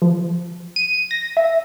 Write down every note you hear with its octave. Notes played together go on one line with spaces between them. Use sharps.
F3
D#7
A#6
E5